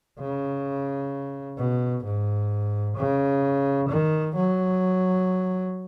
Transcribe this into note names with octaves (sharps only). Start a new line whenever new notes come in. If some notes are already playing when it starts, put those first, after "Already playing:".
C#3
B2
G#2
C#3
D#3
F#3